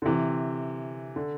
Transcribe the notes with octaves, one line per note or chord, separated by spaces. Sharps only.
D3
C3 E3
D3